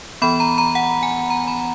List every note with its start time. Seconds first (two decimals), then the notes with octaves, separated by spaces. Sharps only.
0.22 E3 B3 B5
0.40 A#5
0.58 A#5
0.75 F#5
1.03 G#5
1.30 A#5
1.48 B5